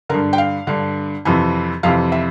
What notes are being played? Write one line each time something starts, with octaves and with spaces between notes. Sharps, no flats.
G2 D3 A#4
G5
F5
G2 D3
F2 C3 E3
F2 C3 E3 F5
E5